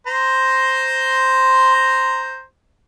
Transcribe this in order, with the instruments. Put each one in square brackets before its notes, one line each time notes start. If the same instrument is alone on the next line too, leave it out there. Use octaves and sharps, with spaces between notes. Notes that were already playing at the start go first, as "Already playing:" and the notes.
[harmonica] C5 A#5 C6